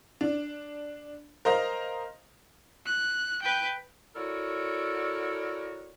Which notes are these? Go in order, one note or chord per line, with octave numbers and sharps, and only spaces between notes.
D4
A#4 C5 D#5 F5 A#5
F#6
B4 G5
E4 F#4 A4 A#4 C#5 D5